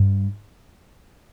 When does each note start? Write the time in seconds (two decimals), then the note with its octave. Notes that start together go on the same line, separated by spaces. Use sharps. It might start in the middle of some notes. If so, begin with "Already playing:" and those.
Already playing: G2